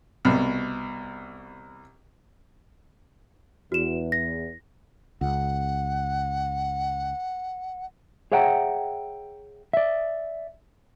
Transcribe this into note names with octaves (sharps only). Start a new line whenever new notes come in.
C2 B2
E2 F#4 E7
A#6
C#2 F#5
G#4 C#5 E5 F#5 G5 A#5
D5 E5